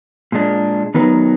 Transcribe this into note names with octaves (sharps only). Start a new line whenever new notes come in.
A#2 G#3 D4
D#3 F#3 B3 D#4 B4